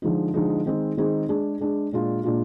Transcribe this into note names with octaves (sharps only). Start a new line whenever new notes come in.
D3 F3 G#3 D#4
D3 F3 G#3 D#4
D#3 G#3 C4 D#4 G#4
D#3 G#3 C4 D#4 G#4
G#3 D4 G#4
G#3 D4 G#4
A#2 G#3 D4 F4
A#2 G#3 D4 F4